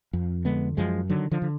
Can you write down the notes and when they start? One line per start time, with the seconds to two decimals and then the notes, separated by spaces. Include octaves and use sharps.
0.13 F2
0.45 D3 G#3 B3
0.77 F#2 F3 G#3
1.09 D3 D#3 F#3
1.31 D3 F3
1.42 D3